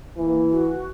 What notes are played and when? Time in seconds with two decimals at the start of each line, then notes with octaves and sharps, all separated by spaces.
0.18 E3 A#3
0.51 F#4